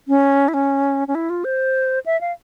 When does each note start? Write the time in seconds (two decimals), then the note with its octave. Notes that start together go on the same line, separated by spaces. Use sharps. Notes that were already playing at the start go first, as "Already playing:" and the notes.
0.08 C#4
0.48 E4
0.54 C#4
1.08 C#4
1.15 E4
1.30 F4
1.44 C5
2.06 E5
2.21 F5